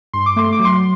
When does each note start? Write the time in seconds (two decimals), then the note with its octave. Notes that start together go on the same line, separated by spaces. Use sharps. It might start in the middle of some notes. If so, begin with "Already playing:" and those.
0.13 G2 C6
0.26 D6
0.36 A3 C6
0.52 D6
0.59 F#3
0.65 C6